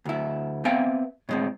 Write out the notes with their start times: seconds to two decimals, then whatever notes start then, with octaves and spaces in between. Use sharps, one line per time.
0.05 D2 E4
0.65 B3 C4 E5 F5 G5 G#5
1.29 A2 G#3 C4